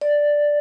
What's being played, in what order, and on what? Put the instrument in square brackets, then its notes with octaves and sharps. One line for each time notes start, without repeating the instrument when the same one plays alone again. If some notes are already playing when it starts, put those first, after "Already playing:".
[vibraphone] D5